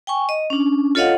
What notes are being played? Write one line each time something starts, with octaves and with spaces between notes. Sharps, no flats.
G5 G#5 C#6
D#5
C#4 D4
F4 A4 C#5 D#5 F5 F#5